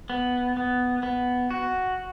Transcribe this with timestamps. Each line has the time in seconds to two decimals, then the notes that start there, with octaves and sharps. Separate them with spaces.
0.10 B3
0.57 B3
1.03 B3
1.51 F#4